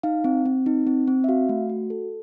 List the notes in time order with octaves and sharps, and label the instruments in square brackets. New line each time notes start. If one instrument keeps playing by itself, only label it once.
[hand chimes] D#4 F5
C4
C4
D#4
C4
C4
E5
F#4 F5
A3
F#4
A4